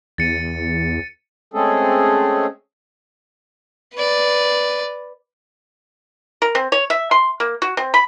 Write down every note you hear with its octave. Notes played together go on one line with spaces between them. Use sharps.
E2 A6 C#7 D#7
G#3 A3 C4 C#4 G#4 A4
B4 D5
A#4
C4
C#5
E5
C6
A#3
F#4
C4
B5